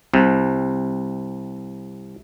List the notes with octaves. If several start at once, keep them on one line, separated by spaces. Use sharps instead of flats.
C2 C3